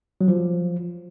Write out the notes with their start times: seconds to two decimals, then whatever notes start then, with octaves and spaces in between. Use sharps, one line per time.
0.21 F#3
0.28 F3